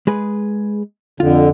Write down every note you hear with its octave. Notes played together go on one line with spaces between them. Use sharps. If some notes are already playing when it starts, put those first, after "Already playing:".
G#3 G#4 B4
F2 D3 F4